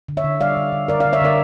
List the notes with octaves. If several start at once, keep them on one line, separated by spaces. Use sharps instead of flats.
D3
C#5 E5
D3
G3 D5 F5
D3
D3
D3 A#4 D5
D3 D5 F5
C#5 E5
D3 A#4 D5